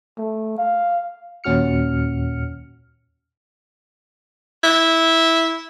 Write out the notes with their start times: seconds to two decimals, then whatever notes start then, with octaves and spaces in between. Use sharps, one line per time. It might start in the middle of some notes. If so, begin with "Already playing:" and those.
0.18 A3
0.58 F5
1.44 D#2 A#2 C#4 F#4 F6 C#7
4.63 E4